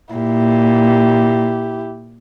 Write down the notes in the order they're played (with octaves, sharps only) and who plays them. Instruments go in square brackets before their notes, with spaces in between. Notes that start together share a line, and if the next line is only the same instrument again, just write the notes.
[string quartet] A#2 [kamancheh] E4 G4